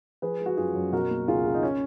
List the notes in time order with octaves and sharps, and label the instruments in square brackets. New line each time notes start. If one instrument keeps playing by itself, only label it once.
[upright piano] F3 G#4 B4
G#3
F#4
F#2 F4 G#4
F#2
B2 F#4 A#4
A#3
C#2 F4 G#4
C#2
D#4
C#4